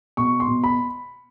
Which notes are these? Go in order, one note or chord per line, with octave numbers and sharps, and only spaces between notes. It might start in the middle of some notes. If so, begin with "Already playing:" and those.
B2 C#6
C6
B2
B5